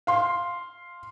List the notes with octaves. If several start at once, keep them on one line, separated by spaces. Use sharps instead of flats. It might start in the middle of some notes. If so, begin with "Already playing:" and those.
F5 C6